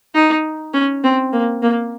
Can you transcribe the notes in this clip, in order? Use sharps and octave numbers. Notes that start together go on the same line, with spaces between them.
D#4
C#4
C4
A#3
A#3